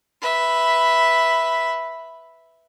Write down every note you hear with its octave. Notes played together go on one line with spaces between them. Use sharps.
B4 E5